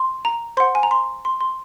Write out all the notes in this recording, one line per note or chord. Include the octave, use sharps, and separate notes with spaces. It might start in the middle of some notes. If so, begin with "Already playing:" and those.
Already playing: C6
A#5
C5 F#5 C6
G#5
A#5
C6
C6
C6